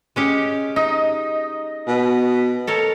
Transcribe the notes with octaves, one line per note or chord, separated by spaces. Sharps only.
G#3 C#4 G4
D#4 D#5
B2
A4 A#4 C#5